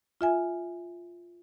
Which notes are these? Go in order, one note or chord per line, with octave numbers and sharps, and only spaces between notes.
F4 E5 G#5